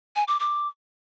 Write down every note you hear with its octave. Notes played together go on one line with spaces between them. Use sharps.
G#5
D6
D6